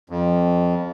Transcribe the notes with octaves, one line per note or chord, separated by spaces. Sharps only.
F2